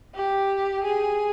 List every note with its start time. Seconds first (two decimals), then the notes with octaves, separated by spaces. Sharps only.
0.15 G4
0.84 G#4